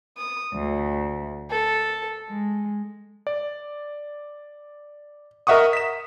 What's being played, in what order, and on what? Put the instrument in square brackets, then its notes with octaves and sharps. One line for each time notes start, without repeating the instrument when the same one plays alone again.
[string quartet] D#6
D2
A4
G#3
[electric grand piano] D5
A#4 D#5 E5 F#5 C#6 D#6
B6 E7